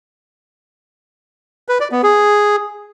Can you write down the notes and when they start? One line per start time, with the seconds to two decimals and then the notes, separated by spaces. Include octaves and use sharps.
1.69 B4
1.80 D5
1.92 B3
2.03 G#4